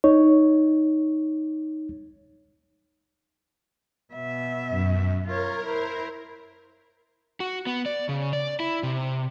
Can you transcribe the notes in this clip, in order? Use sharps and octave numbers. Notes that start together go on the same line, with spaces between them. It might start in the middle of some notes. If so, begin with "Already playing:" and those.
D#4 C#5
B2 E5
F#2
F4 A#4 C#5
E4 C5
F#4
B3
D5
C#3
D5
E4
C3